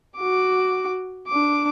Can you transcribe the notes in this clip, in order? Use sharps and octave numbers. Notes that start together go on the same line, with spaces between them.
F#4 D6
D4 D6